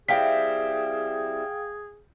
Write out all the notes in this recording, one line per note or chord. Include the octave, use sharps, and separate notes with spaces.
G3 C4 E4 G#4 F5 G5 B6